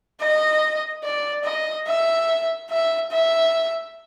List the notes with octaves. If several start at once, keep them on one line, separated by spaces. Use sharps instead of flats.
D#5
D5
D#5
E5
E5
E5